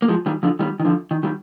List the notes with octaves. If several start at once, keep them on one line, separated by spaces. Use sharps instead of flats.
A#3
F3 G#3
D#3 G3
D3 F3
D#3 G3
D#3
D3 F3
D#3
D#3 G3